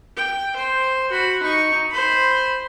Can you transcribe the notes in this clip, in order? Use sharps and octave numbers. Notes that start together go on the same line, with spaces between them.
G5
C5
F#4 B5
D#4 C#6
C5 B5